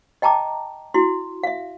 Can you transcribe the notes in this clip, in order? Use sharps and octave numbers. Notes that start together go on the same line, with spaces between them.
D#5 G5 A5 A#5 D6
E4 F#4 C6
E5 F5